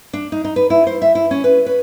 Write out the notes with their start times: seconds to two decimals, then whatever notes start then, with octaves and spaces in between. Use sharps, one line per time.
0.13 D4
0.32 D#4
0.45 D#4
0.56 B4
0.70 E4
0.87 C5
1.02 E5
1.15 E4
1.31 C#4
1.44 B4
1.66 B4